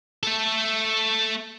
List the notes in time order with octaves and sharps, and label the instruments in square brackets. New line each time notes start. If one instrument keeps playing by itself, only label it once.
[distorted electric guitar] A3 A4